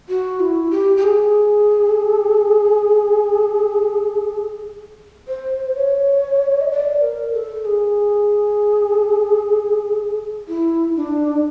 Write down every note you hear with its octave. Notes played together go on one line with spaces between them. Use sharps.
F#4
E4
G4
G4
G#4
C5
C#5
D#5
D5
A#4
A4
G#4
E4
D4